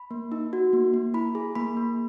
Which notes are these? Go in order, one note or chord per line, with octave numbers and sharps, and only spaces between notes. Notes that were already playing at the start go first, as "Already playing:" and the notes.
Already playing: B5
A#3
D#4
F#4
A#3
A#3
E4 B5
G#4
A#3 B5
A#3